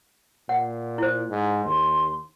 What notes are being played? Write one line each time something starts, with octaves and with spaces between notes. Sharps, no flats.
A#2 F#5
E4 C5
G#2
D#2 C6